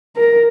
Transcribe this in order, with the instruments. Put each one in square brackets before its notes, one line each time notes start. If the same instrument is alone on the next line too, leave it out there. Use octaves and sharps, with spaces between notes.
[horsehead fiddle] A#4